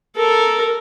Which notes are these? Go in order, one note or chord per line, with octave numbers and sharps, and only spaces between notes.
A4 A#4